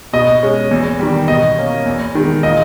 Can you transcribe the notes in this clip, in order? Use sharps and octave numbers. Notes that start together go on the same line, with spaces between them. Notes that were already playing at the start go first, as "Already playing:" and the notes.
B2 D#5
G#3 C#4
E2
D#3 G3
B2 D#5
A#3 C#4
E2
D#3 G#3
A#2 D#5